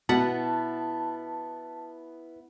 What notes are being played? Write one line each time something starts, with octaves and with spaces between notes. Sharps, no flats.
B2 B3 E4 B4 F#5 A5